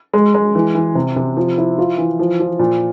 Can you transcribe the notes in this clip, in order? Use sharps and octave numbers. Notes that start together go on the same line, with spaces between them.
G#3
G#3
E3
E3
C3
C3
F3
E4
F4
E3
F3
F3
A#2